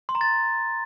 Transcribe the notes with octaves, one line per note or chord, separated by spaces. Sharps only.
C6
A#5
A6